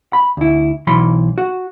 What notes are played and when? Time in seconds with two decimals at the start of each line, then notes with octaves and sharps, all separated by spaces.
0.13 B5
0.37 D2 E4
0.87 B1 E3 F#3 B5 C6
1.38 F#4